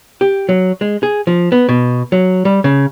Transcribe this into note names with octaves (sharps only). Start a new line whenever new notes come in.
G4
F#3
G#3
G#4
F3
B3
B2
F#3
G3
C#3